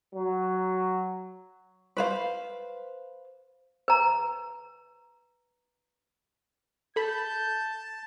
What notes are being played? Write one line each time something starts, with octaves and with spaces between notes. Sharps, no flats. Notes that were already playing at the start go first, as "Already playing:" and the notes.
F#3
B4 C5 F5
B4 A#5
A4 A5 B5 G6